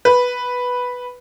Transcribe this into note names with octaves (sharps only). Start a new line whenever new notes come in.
B4